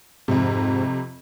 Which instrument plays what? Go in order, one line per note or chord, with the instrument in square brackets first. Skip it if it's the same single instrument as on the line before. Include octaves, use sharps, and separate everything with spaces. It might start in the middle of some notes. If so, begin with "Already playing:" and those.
[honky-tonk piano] F2 C3 [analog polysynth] G#2